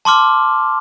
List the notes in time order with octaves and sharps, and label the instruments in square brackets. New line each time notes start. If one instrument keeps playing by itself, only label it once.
[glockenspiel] A5 C6 D6 F6